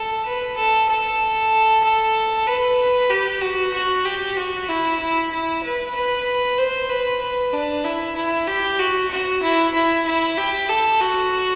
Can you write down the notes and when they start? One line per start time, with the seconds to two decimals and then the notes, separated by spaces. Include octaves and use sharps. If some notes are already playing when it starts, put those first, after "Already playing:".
Already playing: A4
0.25 B4
0.56 A4
0.89 A4
1.84 A4
2.47 B4
3.10 G4
3.41 F#4
3.73 F#4
4.05 G4
4.37 F#4
4.69 E4
5.00 E4
5.31 E4
5.63 B4
5.95 B4
6.58 C5
6.89 B4
7.21 B4
7.53 D4
7.84 E4
8.16 E4
8.47 G4
8.79 F#4
9.11 F#4
9.42 E4
9.74 E4
10.06 E4
10.37 G4
10.69 A4
11.00 F#4